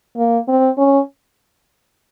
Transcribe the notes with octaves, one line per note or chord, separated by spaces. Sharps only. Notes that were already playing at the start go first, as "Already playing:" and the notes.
A#3
C4
C#4